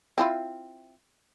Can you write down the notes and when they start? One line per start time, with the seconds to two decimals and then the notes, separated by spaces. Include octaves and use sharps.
0.18 C4 E4 F4